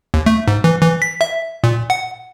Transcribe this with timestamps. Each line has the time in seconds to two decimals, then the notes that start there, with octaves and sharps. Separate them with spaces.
0.14 D#2
0.26 A3
0.48 G#2
0.64 E3
0.82 E3
1.02 B6
1.21 E5
1.64 A#2
1.90 F#5